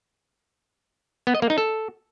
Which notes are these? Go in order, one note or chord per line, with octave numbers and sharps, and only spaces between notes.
B3
D#5
A#3
D#4
A4